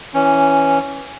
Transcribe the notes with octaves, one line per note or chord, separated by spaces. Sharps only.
E3 C#4